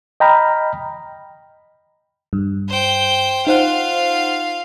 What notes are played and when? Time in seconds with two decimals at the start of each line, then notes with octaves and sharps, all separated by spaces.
0.20 D#5 G5 A#5 B5 F6
2.33 G2
2.68 C5 G5
3.47 D#4 F4 C5 F5 F#5